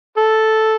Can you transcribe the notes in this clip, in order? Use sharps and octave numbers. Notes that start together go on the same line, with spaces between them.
A4